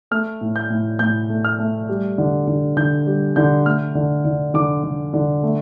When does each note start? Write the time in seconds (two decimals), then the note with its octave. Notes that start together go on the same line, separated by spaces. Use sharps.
0.11 A3 F6
0.41 A2
0.56 G6
0.70 A2
0.99 A2 G6
1.29 A3
1.45 F6
1.59 A3
1.89 G3
2.18 D3
2.47 D3
2.77 D3 G6
3.07 G3
3.36 D3 G6
3.66 A3 F6
3.95 D3
4.25 D3
4.54 D3 D6
4.83 D3
5.14 D3
5.43 A3